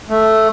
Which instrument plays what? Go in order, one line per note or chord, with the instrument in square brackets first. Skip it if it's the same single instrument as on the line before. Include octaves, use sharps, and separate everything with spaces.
[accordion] A3